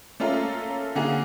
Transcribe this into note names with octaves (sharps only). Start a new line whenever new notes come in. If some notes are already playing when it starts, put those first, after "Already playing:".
A3 A#3 C#4 F4 A4 A#4
D3 A#3 F#4 G#4